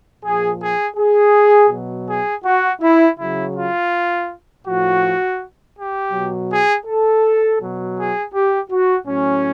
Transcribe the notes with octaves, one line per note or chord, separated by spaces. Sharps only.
A#2 F3 G#4
G#4
G#4
B2 F#3
G#4
F#4
E4
C#3 F#3 E4
F4
A2 F3 F#4
G4
B2 F#3
G#4
A4
B2 F#3
G#4
G4
F#4
A2 F#3 C#4